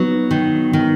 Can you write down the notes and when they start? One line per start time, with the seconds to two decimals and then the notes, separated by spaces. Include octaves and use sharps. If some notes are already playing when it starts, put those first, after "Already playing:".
Already playing: F#3 B3 D#4
0.31 D#3
0.73 D#3